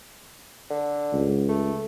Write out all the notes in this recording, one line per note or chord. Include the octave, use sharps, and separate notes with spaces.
D3
C#2
A3